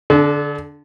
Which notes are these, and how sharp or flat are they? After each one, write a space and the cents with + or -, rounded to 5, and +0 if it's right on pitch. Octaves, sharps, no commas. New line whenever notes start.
D3 +0 A4 -40